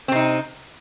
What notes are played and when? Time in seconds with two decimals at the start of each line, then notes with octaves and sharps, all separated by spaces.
0.08 C4
0.12 C3
0.16 D#4